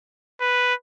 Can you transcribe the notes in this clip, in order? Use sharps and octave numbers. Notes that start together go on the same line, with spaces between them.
B4